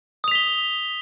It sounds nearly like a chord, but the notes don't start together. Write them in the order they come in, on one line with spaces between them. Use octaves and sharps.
D#6 F7 B6 G7